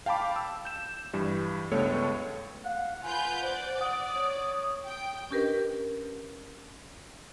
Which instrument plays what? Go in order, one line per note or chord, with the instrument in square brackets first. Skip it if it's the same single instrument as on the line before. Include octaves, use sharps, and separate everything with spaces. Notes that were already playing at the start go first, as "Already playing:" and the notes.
[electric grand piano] F5 G5 A5 B5 D6
A5 E6
G6 E7
G2 E3 G3
C#2 G2 A3 B3 A4 C#5
[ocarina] F5 [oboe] F#5
[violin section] F4 B4 G6 [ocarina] G#5
[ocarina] C5 [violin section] D5
[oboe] F#5 [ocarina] D#6
[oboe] C#5
[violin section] G5
[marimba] C#4 D4 G4 A#4 B4 D#5